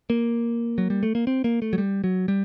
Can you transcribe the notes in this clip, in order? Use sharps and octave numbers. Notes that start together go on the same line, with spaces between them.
A#3
F#3
G3
A3
A#3
C4
A#3
A3
F#3
G3
F#3
G3